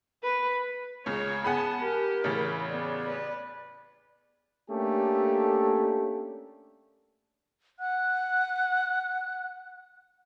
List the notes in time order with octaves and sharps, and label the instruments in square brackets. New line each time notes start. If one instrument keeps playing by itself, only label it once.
[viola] B4
[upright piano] C#2 C#3 [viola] C#5
[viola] B3 A5 [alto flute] G#4 [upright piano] F#5 G#5 B5
[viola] G4 [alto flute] A#4
[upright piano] A1 C#3 [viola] E4
[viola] B3 [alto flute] D5
[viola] B4
[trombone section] A3 A#3 C#4 D4 G4 A4
[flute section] F#5 F#6